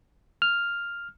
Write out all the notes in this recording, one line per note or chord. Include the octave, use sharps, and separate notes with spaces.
F6